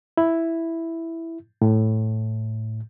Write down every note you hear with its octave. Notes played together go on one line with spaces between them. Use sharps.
E4
A2